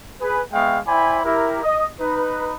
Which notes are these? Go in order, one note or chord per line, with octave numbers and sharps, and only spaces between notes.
G#4 B4
G#3 B3 E5 F5 G5 C#6
E4 C5 D5 G5 G#5 B5
E4 G4 A#4
D#5
D#4 B4